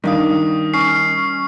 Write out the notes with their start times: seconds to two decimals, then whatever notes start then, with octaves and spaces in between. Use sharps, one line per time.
0.04 D#3 G3 D4 F5 D#6 B6
0.74 C#4 C7